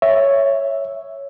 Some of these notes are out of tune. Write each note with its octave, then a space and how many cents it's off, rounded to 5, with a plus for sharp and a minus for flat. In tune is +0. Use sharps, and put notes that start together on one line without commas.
C#5 +0 E5 +0